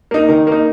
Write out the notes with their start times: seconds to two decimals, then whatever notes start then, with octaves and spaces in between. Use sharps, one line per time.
0.11 A#3 D#4
0.29 D#3
0.47 A#3 D#4